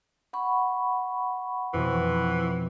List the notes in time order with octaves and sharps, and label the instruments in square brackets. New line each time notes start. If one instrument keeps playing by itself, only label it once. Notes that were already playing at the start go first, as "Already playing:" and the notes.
[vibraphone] F#5 B5 C#6
[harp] F2 B2 F3 [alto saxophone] E3